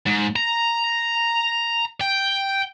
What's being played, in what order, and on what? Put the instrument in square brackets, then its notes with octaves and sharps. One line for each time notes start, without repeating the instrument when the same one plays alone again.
[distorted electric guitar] G#2
A#5
G5